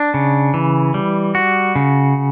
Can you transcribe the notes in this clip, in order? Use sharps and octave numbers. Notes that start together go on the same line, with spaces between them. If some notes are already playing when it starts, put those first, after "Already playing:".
Already playing: D4
C#3
E3
G3
F#4
C#3